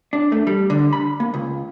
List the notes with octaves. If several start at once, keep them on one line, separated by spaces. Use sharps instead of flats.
D4
A3
G3
D3
B5
A#3
C#2